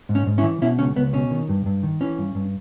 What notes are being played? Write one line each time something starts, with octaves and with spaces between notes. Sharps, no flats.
G#2
C#4
G#2
C#4 E4
E3
B2 C#4 E4
C#2 C#4
C#2 B3
B2 C#4
D#3
G2
G2
D#3
E3 C#4
G2
G2